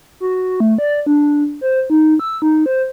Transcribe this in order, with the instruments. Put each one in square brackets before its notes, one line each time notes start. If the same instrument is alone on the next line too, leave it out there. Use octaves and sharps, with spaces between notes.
[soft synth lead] F#4
A3
D5
D4
C5
D#4
E6
D#4
C5